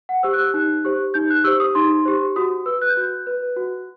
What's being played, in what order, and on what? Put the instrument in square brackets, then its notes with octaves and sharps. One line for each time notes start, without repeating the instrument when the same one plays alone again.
[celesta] F#5
G4 C5 E6
F#6
E6
D#4 F#6
G4 C5
D#4 G6
F#6
G4 C5 E6
D#6
D#4 C6
G4 C5
F#4 D#6
B4 E6
F#6
G6
F#4 F#6
B4
F#4